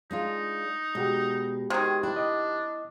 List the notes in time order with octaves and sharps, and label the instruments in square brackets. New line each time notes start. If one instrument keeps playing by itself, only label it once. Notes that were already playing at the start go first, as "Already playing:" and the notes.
[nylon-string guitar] G#3 D4 F4 [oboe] D#4
[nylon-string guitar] B2 [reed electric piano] G#3 F#4 G4
[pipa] C3 D#3 [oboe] G#4
[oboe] D4 [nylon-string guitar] E4
[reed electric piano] D#5 D6